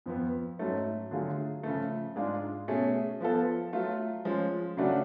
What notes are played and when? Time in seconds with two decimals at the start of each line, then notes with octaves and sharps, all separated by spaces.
0.06 F2 F3 B3
0.59 G#2 F#3 A3 C#4
1.11 D3 F#3 A3 F4 G#4
1.63 C#3 F3 A3
2.16 G#2 G#3 D4 F4
2.68 B2 A3 C#4 G#4
3.20 F3 B3 F4 A4
3.73 F#3 A3 F4
4.25 F3 G#3 C#4
4.77 C#3 F#3 A3 D4 F#4